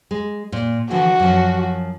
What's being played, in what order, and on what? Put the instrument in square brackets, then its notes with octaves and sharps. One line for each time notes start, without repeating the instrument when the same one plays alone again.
[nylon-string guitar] G#3
A#2
[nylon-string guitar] D3 E3 F3 [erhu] F#4
[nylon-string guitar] F#2 F3